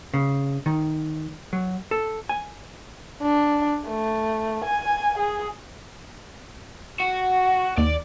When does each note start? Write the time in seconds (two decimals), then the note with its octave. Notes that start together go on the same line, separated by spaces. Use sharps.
0.14 C#3
0.66 D#3
1.53 F#3
1.91 A4
2.29 G#5
3.22 D4
3.86 A3
4.65 G#5
5.18 G#4
7.00 F#4
7.78 D#2 D5